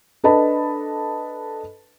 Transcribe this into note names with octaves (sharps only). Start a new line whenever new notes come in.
D4 A4 B4 D#5 A5 B5